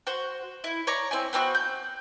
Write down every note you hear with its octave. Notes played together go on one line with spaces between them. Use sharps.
F#4 C5
E4
C#5 D5 A#5
C4 E4 G#5
B3 C4 D4 F#4
G6